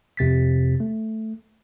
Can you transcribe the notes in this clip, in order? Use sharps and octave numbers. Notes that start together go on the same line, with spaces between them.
F2 C3 A6 B6
A3